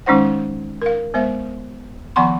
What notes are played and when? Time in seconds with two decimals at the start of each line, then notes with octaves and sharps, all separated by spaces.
0.06 D#3 G#3 C#4 D#4 C5 F#5
0.82 A#4 F5
1.14 G#3 B3 C5 E5
2.16 D#3 F3 B3 F#5 B5 C6